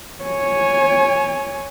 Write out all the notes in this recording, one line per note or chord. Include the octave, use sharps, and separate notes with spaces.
C#5 G#5